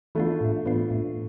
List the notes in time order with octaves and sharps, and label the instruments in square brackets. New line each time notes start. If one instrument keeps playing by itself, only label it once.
[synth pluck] E3 B3 D4 F4 [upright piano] A3
[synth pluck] A2
E3 B3 D4 F4
A2